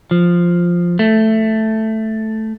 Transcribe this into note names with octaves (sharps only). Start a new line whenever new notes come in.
F3
A3